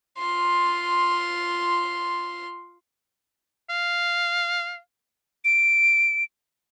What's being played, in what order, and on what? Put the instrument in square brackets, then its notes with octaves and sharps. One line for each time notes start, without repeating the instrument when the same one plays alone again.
[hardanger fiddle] F4 C6
[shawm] F5
[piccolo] D7